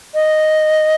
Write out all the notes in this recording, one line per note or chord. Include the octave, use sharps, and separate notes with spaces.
D#5